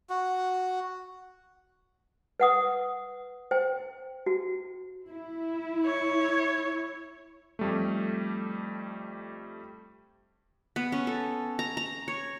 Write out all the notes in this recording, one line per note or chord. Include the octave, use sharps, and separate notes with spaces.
F#4
B4 F#5 D#6
C5 G5
F#4
E4
C#5
F2 G3 A3
B3
C#4
A4
A#5
A#5
C#5